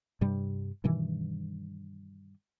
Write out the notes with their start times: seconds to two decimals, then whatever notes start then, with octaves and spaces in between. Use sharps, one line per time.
0.21 G2 C3 G3
0.84 G2 B2 D#3 E3